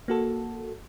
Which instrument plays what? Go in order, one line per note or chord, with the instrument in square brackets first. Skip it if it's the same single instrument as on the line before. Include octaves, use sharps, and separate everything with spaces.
[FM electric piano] A#3 F#4 A4